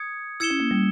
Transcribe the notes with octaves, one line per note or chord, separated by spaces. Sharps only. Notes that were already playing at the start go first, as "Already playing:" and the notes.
Already playing: D#6 G#6 C#7
E4 E6 G#6 C#7 E7 G7
C#4
A#3
G3